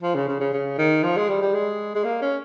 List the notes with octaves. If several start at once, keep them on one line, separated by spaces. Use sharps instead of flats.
F3
C#3
C#3
C#3
C#3
D#3
F3
G#3
G3
G3
G#3
G#3
A#3
C#4